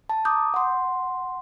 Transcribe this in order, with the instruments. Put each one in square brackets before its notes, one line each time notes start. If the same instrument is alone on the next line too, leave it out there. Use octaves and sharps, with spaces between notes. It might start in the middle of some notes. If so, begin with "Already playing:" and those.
[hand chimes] A5
A#5 D6 D#6 G6
F#5 C6